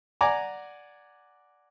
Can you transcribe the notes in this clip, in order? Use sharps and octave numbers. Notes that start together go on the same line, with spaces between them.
D5 F#5 G#5 A#5 D6